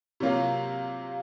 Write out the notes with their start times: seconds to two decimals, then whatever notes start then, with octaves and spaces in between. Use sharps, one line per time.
0.20 C3 F#3 A#3 F4